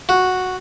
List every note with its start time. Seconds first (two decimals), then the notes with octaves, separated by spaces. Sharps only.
0.09 F#4